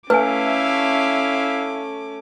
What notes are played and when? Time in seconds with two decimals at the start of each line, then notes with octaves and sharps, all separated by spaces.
0.10 A3 C#4 E4 B4 E5 F5 G#5 D6